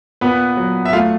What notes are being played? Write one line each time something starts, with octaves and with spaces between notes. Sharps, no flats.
A#2 B3 B4
F#3
E5
A3 F4 F5